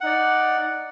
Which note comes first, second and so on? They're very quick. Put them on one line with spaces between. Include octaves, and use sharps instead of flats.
F#5 D#4 D5